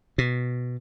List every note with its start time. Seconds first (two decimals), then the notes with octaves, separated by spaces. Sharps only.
0.18 B2